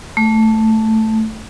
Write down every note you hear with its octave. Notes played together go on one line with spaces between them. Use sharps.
A3